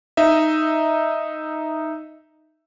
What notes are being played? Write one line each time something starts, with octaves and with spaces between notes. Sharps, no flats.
D#4 D#5 E5